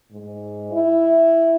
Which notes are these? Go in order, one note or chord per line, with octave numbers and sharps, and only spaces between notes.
G#2
E4